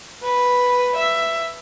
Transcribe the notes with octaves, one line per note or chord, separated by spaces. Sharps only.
B4
E5